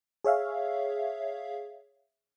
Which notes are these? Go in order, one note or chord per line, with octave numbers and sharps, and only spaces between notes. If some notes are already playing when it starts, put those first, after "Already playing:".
G#4 C#5 E5 F5